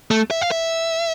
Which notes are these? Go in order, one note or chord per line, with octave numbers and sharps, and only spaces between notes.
A3
E5
F5
E5